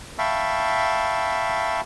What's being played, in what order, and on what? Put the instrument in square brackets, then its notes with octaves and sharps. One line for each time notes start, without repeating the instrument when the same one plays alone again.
[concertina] E5 F5 G5 A5 B5 C#6